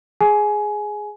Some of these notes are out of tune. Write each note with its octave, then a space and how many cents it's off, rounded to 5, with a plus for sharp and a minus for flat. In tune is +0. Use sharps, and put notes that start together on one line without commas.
G#4 +0 G#5 +20